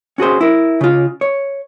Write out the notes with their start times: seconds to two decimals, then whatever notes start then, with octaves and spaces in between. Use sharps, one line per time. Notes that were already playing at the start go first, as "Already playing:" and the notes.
0.18 C#4 F#4 G#4 C5
0.41 E4 A#4
0.81 C#3 F4
1.21 C#5